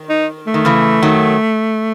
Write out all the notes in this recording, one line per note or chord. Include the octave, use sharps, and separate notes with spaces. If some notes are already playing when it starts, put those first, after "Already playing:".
Already playing: D#3
D#4
A3
D#3
C#3 E3
D#3 F#3